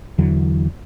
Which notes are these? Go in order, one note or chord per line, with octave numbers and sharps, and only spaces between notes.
E2 D3 E3 F#3